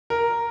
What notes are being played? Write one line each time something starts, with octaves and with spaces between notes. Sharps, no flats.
A#4